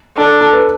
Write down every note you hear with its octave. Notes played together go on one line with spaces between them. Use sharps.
D4 A4
A4
B4